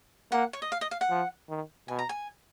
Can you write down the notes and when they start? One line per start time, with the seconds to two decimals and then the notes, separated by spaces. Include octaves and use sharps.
0.32 A#3 F#5
0.53 C#5
0.62 D#5
0.72 F5
0.81 D#5
0.91 F5
1.01 F#5
1.10 F3
1.49 D#3
1.88 B2 G#5
1.99 A#5
2.09 G#5